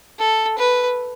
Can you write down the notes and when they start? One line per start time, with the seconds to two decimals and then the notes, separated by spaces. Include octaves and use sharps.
0.19 A4
0.58 B4